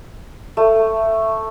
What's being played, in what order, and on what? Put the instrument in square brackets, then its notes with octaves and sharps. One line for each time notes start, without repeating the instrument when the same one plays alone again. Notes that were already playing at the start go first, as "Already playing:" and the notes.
[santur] A3